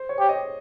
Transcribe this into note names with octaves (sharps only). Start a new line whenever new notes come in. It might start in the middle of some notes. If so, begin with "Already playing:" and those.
Already playing: C5
C#5
G4
C#5
D#5